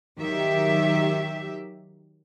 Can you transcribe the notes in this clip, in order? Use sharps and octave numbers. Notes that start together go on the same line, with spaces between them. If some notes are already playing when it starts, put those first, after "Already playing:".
D#3 F#3 G4 E5